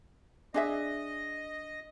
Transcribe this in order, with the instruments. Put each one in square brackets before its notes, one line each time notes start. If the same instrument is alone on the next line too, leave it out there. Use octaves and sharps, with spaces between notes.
[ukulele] D4 G#4 E5 [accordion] D#5